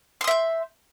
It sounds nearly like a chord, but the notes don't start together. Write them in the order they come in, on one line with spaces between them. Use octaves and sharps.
C6 D#6 E5 G6